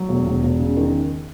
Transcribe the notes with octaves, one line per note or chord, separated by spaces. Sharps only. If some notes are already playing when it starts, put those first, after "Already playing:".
Already playing: F#3
E1
E1
E1
C#3
D#3